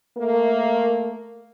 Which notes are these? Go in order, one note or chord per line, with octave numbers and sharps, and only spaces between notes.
A3 A#3